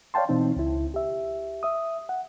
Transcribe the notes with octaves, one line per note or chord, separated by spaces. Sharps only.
C#5 D5 F5 G5 A5 C6
B2 E3 C4 D#4
C#2 E4
G4 E5
E5 D#6
F#5